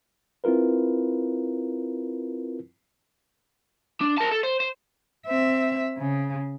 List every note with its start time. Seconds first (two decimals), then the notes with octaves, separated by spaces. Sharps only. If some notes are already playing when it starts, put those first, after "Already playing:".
0.44 C4 E4 F4 A#4 B4
4.01 D4
4.18 A#4 A5
4.31 A4
4.43 C5
4.60 C5
5.27 C4 E5
5.98 C#3